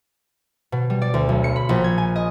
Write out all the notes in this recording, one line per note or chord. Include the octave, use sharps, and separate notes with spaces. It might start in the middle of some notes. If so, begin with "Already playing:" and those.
B2
G3
D5
D2
B1
C#7
B5
A#1
G#6
G#5
D#5